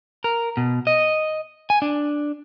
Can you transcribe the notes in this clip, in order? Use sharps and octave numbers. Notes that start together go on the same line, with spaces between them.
A#4
B2
D#5
G#5
D4